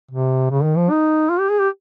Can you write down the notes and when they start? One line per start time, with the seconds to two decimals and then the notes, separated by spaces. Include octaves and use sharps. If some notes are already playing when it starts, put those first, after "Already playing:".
0.11 C3
0.51 C#3
0.64 D#3
0.77 F3
0.90 D#4
1.29 F4
1.40 G4
1.50 G#4
1.60 G4